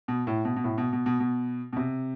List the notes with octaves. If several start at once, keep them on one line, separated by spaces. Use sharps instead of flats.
B2
A2
B2
B2
A2
B2
B2
B2
B2
B2
C3